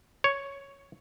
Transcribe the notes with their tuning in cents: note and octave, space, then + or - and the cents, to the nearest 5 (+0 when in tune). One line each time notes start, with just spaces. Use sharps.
C#5 +0